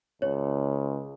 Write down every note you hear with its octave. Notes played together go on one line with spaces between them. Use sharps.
C#2 C#5